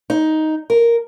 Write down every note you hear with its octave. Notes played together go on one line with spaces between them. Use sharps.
D#4
A#4